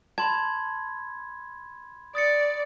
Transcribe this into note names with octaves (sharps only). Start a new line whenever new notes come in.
A5 B5 C6 G#6
D5 D#6 A6 C#7